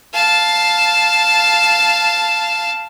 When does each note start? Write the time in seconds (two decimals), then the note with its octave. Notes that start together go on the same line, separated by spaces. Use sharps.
0.14 F5 A5